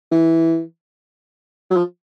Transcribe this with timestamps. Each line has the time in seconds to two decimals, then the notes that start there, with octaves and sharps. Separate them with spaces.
0.12 E3
1.71 F#3
1.77 F3